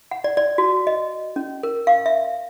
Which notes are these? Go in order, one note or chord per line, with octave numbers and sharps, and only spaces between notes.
F#5
D5
D5
F#4
D#5
C#4
A#4
F5
E5